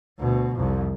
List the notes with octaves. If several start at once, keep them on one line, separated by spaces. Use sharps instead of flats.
D2 B2
C2 F2